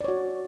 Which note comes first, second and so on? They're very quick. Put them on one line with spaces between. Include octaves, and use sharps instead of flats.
D5 C#5 F#4